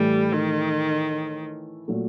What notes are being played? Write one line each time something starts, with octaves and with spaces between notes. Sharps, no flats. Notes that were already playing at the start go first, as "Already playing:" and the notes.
Already playing: A2 E3 G3 A3
D#3
A#2 F#3 A3